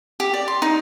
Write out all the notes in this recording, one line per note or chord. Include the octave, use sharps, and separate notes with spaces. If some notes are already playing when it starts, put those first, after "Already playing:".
G4
D5
C6
D#4